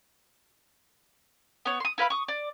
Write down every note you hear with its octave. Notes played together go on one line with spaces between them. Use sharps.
B3 C#5
C6 D#6
E4 B4 F5 B5
C#6 D#6
D5